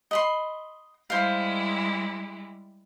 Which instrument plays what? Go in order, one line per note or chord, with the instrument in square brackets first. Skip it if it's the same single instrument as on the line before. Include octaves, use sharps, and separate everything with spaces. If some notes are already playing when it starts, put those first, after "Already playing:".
[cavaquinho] D#5 B5 C6
[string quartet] G3 G#3 E4 [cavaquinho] C5 F5